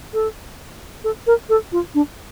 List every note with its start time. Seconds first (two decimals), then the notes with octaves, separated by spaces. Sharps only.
0.14 A4
1.04 A4
1.27 A#4
1.50 A4
1.72 F4
1.95 D4